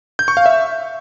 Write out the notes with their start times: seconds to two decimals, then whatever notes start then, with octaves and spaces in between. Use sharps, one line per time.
0.19 G6
0.28 C#6
0.37 F5
0.46 E5